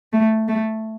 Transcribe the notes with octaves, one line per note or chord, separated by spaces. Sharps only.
A3
A3